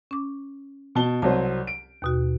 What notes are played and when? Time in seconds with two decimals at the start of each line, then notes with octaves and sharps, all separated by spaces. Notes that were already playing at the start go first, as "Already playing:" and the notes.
0.11 C#4 D6
0.95 B2 A5 G7
1.22 C2 F#3 C5 A5
1.67 D7
2.02 D#2 B2 F#4